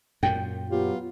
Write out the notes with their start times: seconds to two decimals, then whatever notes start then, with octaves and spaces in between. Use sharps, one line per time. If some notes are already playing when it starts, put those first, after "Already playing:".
0.23 F#2 A#2 G5
0.70 F#3 B3 F4 G4